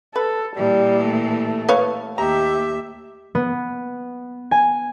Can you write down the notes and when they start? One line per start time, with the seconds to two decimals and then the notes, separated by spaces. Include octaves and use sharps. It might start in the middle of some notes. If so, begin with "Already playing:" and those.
0.16 A4 B4
0.56 A#2 E3 G3
1.06 A3
1.69 B4 C#5 F5
2.18 D#2 G4 E5 A#5
3.35 B3
4.51 G#5